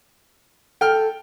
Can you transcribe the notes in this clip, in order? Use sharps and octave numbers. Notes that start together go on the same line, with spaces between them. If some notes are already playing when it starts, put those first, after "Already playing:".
A4 G5 F6